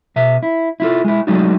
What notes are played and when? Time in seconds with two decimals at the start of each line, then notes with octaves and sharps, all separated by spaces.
0.16 B2 E5
0.43 E4
0.80 E4 F4 A4
1.04 G#3 E4
1.27 F#3 G#3 A3 D4 D#4 F#4